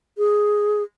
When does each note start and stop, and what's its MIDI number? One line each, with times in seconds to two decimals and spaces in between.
0.18 0.83 68